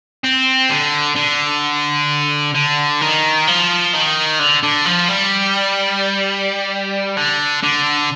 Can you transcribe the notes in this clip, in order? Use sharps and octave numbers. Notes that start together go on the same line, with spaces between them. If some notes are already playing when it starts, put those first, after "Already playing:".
C4
D3
D3
D3
D#3
F3
D#3
D3
D3
F3
G3
D3
D3